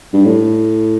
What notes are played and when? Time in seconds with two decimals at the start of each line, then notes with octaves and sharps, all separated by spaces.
0.13 G2
0.25 A2